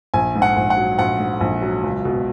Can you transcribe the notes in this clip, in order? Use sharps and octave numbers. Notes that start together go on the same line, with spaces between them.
A#1 G#5
G#2
F#5
A#1
F#5
F#3
A#1 F#5
G#2
A#1
F#3
C#2
B2